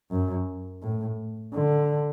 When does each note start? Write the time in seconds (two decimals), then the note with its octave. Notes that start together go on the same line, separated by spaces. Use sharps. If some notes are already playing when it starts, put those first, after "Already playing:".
0.11 F#2
0.83 A2
1.54 D3